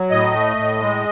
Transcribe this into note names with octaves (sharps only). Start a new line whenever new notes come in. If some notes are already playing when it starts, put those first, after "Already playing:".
Already playing: F#3
A2 D#5
A3
A2
G#3